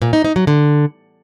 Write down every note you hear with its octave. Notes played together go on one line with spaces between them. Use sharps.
A#2
D#4
D#4
F#3
D3